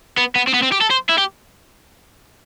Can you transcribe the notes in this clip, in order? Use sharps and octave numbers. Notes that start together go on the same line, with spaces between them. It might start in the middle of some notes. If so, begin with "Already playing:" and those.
B3
B3
C4
B3
C4
G4
A4
C5
E4
G4